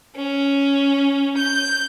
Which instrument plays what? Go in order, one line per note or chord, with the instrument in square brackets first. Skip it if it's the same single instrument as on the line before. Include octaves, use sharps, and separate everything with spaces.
[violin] C#4
G6